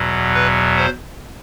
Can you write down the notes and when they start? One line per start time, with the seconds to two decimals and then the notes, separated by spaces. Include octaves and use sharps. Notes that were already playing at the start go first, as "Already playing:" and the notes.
Already playing: E2 B2 F#3
0.34 B4
0.77 C5